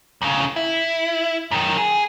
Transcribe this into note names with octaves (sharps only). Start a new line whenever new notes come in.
D#2 C#3
E4
F#2 D#3
G#4